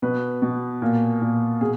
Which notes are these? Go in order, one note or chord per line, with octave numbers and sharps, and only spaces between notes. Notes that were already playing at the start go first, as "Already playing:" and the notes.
B2 B4
B2
A#2
A#2
B2 G#4